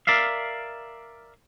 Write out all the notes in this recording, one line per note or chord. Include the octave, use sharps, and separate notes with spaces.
A#4 D5 E5 F5